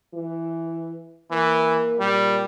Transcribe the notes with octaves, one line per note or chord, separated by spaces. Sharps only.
E3
E3 A#3
A#2 G3